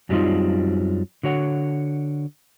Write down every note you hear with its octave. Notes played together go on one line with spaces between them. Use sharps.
F#2 F#3 G3 C4 D#4 F4
D3 F#4 C#5 F#5